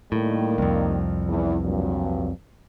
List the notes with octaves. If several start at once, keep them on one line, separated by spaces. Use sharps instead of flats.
A2 D#3 G3 A#3
C2 F2
E2
G2 A#2 F#3